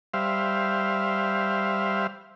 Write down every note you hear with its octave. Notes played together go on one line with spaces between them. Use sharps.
G3 C5 E5 F5